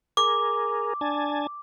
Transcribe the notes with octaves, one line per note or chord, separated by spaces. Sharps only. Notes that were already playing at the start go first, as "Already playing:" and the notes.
G#4 A#4 D6
D4 G#5 A5